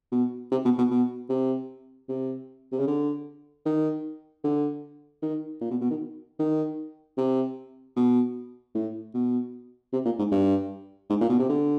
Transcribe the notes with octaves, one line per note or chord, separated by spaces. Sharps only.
B2
C3
B2
B2
B2
C3
C3
C3
C#3
D3
D#3
D3
D#3
A#2
B2
B2
D#3
D#3
C3
B2
A2
B2
C3
A#2
G#2
G2
G#2
A#2
B2
C3
D3